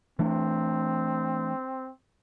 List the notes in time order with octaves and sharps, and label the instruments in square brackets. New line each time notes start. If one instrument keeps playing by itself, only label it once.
[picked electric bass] E3 A3 D4 [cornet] C4